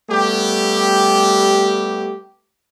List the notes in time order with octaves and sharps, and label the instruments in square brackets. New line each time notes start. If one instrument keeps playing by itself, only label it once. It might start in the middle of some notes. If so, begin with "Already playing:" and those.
[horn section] G3 A3 B3 G4